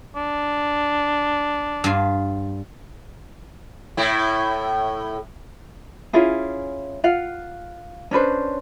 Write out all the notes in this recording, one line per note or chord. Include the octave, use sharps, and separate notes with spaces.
D4
G2 F4
A2 E4
C#4 E4 F4 G#4
F4 F5 F#5
C#4 D4 B4 C5